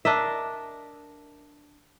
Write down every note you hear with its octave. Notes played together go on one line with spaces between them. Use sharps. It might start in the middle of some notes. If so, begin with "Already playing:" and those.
D4 A#4 D#5 E5